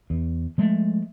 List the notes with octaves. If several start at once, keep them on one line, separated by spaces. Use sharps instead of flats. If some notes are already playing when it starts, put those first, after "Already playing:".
E2
F3 G#3 A3